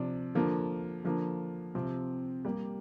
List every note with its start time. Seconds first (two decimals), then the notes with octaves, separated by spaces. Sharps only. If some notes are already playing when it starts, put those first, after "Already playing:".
Already playing: C3 F3 D4
0.35 D3 F3 A#3
1.05 D3 F3 A#3
1.75 C3 F3 C4
2.45 G3 A#3 G4